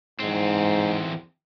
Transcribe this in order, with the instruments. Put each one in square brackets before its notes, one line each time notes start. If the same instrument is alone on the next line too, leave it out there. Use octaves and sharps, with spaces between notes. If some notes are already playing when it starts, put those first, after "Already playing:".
[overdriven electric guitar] E2 C4 [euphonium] G#2